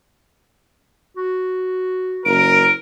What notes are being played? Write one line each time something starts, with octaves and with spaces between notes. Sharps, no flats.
F#4
F#1 A#4 D7